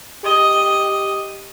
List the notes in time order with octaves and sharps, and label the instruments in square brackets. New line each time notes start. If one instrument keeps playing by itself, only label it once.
[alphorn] G4 [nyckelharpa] D#5